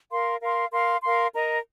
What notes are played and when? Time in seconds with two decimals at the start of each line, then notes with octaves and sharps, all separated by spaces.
0.11 A#4 F5 C6
0.41 A#4 F5 C6
0.72 A#4 F5 C6
1.03 A#4 F5 C6
1.34 A#4 D#5 A#5